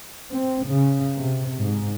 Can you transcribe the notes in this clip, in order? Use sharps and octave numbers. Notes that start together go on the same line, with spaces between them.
C4
C#3
C3
G#2